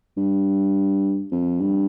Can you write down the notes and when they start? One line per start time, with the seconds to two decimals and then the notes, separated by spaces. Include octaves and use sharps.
0.17 G2
1.31 F2
1.60 G2